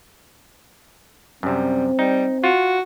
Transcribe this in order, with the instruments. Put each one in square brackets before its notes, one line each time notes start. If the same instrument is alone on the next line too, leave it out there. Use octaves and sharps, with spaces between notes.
[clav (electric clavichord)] F#2 C3 [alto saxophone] G3 [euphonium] C4
[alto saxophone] G3 [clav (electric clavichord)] D#4
[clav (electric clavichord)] F4 [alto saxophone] F#4